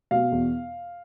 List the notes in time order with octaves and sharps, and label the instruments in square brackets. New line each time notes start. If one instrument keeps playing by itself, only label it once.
[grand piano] B2 F5
E2